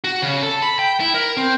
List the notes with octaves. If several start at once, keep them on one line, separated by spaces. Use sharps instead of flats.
F#4
C#3
A4
B5
G5
E4
A#4
C4